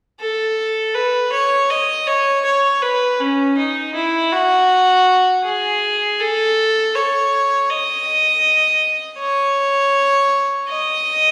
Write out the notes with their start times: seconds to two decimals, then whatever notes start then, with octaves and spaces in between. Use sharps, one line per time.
0.20 A4
0.95 B4
1.32 C#5
1.70 D#5
2.07 C#5
2.45 C#5
2.82 B4
3.20 C#4
3.57 D#4
3.95 E4
4.32 F#4
5.44 G#4
6.20 A4
6.95 C#5
7.69 D#5
9.19 C#5
10.69 D#5